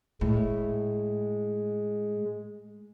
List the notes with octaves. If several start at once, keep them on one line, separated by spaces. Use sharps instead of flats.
A2 G#3